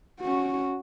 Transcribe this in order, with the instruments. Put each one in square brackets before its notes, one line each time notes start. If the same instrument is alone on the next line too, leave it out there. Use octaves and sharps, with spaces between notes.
[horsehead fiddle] C#4 F#4